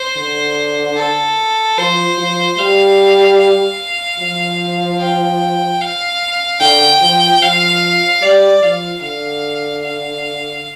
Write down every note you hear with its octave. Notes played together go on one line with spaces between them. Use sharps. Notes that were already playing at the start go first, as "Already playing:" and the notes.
Already playing: C5
D3
A4
F3 C5
F3
G3 F5
F5
F3
G5
F5
D3 G5
F3
F3 F5
G3 D5
F3 F5
D3 F5
F5